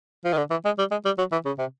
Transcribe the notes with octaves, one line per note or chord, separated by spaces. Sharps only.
F3
D#3
D3
E3
G#3
G3
G#3
G3
F#3
E3
C#3
C3